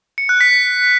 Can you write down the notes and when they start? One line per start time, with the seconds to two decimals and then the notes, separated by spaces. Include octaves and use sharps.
0.18 C#7
0.29 F#6
0.41 B6